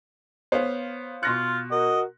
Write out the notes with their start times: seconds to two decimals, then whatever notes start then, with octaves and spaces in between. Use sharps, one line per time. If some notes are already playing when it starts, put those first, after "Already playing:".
0.52 B3 C5 C#5 F5
1.23 B2 F4 C6 F#6 A#6 C#7
1.71 F#4 A#4 D#5